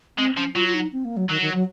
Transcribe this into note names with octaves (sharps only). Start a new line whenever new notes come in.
G#3 C4
F3 C#4
F#3 F4
F4
D#4
C4
A#3
F#3
D#3 F#3
D#3
F#3